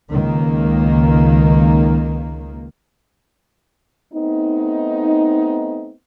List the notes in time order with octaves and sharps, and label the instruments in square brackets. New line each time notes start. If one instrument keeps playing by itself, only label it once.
[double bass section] C#2 D#3 A#3
[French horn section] A3 B3 C4 D#4